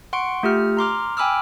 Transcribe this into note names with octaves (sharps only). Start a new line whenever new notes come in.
F#5 C6 C#6 D7
A3 F4 G4 F6
A#5 C6 D6 F6
G5 G#5 B5 D6 E6 F6